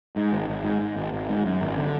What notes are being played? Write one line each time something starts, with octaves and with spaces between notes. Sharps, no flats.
G#2
G#1
G#1
G#2
G#2
G#1
G#1
G#2
F#2
G#1
D3